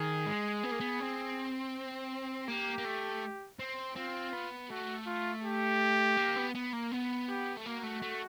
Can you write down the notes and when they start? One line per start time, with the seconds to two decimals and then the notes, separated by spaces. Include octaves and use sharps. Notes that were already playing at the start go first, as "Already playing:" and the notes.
Already playing: D#3 G#4
0.26 G#3
0.63 B3
0.71 A#3
0.80 B3
1.00 C4
2.47 A#3 G4
2.78 A#3
2.85 A3
3.59 C4
3.96 C4 F4
4.33 B3
4.70 A3 F#4
5.07 F4
5.44 G4
6.17 A#3
6.36 B3
6.55 B3
6.73 A#3
6.92 B3
7.29 G4
7.57 A3
7.66 A#3 F#4
7.83 A3
8.02 A3